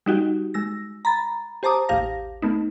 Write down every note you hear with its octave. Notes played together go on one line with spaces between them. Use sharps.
G3 D#4 F#4 G4
G#3 E6 A#6
A#5 B5 A6
G4 C5 A5 A#5 D6 D#6
A1 D#2 G4 F5 A#6
A3 B3 D#4